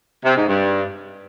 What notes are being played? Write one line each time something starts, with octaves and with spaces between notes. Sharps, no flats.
C3
G#2
G2